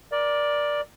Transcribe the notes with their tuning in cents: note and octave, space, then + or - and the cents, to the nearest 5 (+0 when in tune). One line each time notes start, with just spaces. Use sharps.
A#4 +20 D5 +0